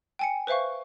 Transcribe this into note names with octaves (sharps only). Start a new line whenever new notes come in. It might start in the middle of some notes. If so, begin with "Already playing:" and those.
G5 G#5 C#7
B4 C5 E5 F5 C#6